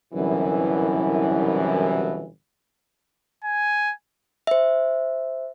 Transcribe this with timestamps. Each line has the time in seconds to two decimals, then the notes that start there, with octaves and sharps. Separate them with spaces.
0.13 G1 C2 F#2 B2 E3
3.44 G#5
4.47 C5 E5